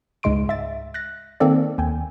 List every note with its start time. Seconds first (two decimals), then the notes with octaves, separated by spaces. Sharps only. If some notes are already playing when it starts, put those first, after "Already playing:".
0.23 C#2 G#2 G#3 C6 D7
0.49 E5 A6
0.94 F#6 A6 A#6
1.40 D#3 A#3 C4 A4 D5
1.78 D#2 G5 G#5